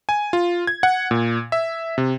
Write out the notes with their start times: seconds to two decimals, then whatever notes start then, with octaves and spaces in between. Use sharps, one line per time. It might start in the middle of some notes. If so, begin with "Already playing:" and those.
0.09 G#5
0.33 F4
0.67 G#6
0.83 F#5
1.11 A#2
1.52 E5
1.98 C3